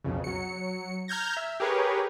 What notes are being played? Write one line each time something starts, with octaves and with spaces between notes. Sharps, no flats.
B1 F2 C#3
F#3 C#7
A#5 F6 G6 G#6 A#6
E5
G4 G#4 A#4 B4 C#5